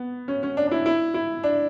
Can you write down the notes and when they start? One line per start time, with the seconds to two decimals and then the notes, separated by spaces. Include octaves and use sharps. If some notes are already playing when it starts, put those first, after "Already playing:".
Already playing: B3
0.28 C#4
0.43 C#4
0.57 D4
0.67 D4
0.71 E4
0.86 E4
1.14 E4
1.43 D4